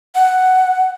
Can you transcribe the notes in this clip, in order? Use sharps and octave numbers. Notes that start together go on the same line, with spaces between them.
F#5